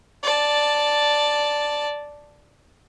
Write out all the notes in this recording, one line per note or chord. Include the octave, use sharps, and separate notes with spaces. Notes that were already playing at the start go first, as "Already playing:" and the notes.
D5 A5